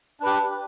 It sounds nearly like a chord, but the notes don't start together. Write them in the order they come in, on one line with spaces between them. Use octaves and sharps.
D4 B4 G4